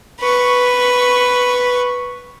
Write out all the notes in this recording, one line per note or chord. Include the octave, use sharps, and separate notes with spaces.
B4 C#6